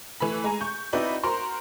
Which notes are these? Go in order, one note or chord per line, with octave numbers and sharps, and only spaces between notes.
E3 A3 B5
G#3 G#5 A#5
C#6 G6
C4 D#4 E4 F#4 B4 D5
F#4 A#4 C5 A#5 C6